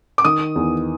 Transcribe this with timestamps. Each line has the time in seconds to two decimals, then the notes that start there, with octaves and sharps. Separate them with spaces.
0.18 D6
0.25 D#3 D#6
0.56 E2